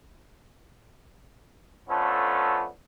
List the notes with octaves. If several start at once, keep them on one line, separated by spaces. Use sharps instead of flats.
F3 A3 B3 C#4 D4 A4